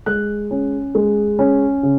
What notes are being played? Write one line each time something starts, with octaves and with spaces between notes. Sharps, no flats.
G#3 F#6
C#4
G#3
C#4
C#3